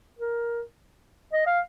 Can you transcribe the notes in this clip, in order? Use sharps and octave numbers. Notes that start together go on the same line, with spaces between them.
A#4
D#5
F5